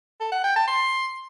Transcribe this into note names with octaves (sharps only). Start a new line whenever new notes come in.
A4
F#5
G5
A5
C6